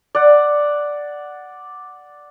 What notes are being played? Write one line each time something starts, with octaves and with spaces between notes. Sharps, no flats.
D5 F#5